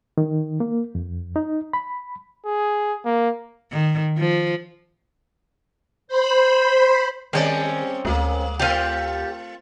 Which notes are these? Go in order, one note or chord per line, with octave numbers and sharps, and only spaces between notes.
D#3
A#3
F2
D#4
B5
G#4
A#3
D#3
F3
C5 B5
D#3 G3 A#3 C4 C#4 D5
D2 G#3 A#3
A3 C4 F4 G4 F5